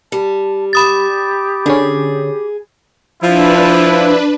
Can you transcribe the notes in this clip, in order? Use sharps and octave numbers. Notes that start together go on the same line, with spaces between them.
G3 A5
G4 B5 D#6 A6
D3 C#4 G#4
F3 D4 E4 B4